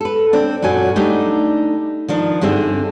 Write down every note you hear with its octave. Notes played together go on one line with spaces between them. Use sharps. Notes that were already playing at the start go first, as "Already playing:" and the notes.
A4 B4
C4 D4
F#2 A#2 F#3 G#5
G3 A3 D4 D#4
D#3 F3 D4
G2 D3 C4 G#4 E5